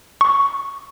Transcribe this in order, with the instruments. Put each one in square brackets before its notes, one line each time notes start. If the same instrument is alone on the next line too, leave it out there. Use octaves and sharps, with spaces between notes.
[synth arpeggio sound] C#6